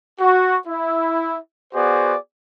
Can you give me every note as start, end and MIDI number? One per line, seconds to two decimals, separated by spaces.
0.20 0.58 66
0.68 1.37 64
1.73 2.15 59
1.73 2.15 66
1.73 2.15 68
1.73 2.15 72
1.73 2.15 74